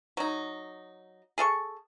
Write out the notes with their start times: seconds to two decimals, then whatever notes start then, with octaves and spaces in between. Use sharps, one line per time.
0.17 F#3 D#4
1.38 G#4 A4 F5 C#6